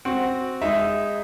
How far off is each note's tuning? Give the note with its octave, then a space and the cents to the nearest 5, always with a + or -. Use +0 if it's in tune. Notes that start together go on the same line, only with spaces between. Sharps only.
C4 +0 F#4 +0
G#3 -20 D#4 +0 E5 +5